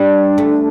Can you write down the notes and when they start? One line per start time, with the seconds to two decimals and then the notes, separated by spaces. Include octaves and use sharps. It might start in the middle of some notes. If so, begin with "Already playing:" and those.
Already playing: G3 D4
0.38 A3